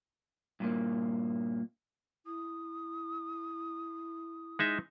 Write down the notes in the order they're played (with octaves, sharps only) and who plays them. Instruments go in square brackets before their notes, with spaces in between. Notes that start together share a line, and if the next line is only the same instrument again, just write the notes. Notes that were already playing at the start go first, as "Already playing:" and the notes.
[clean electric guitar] G2 A#2 A#3
[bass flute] E4 [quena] D#6
[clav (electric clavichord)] G#3 D#4 E5